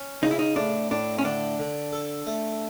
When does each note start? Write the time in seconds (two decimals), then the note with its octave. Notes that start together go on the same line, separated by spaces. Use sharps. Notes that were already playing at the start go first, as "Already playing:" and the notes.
Already playing: C#4
0.22 C#3 D#4
0.31 E4
0.39 D#4
0.56 A2 D4
0.91 A2 D4
1.18 C#4
1.24 D3 D4
1.59 D3
1.93 A4
2.27 A3